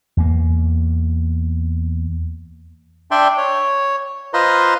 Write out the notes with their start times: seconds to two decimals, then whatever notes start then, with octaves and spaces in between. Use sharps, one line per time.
0.17 E2 A#3
3.11 D4 D5 E5 G5 C6
3.37 C#5
4.34 F4 B4 C5 D#5 A#5 C6